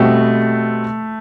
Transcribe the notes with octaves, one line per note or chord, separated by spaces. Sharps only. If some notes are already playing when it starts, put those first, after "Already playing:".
Already playing: B2 G3 A3 C4 F#4